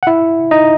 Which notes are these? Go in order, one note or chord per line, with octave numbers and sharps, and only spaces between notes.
F#5
E4 E5
D#4 D#5